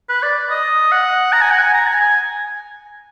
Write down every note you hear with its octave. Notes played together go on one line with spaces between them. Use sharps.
B4
D5
D#5
F#5
A#5
G#5
F#5
G#5
A#5
G#5
G#5